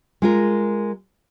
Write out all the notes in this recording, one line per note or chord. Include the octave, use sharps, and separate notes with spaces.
G#3 F4 A#4